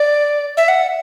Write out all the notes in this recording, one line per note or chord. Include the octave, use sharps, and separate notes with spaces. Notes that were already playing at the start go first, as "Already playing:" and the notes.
Already playing: D5
E5
F#5